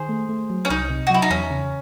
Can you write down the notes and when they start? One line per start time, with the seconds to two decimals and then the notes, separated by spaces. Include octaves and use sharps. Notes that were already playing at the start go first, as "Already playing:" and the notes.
Already playing: D#3 G#4 C5
0.09 A3
0.29 A3
0.50 F#3
0.65 C#4
0.70 C2 D#4
0.90 C3
1.07 F#4
1.10 F#3 E4
1.22 D#4
1.30 E2 C#4
1.51 C#3